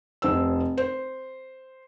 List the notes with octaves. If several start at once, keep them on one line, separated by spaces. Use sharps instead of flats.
F1 C5 E6
C5